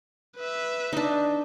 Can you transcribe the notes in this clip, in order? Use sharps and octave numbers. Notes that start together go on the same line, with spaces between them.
B4 E5
D4 D#4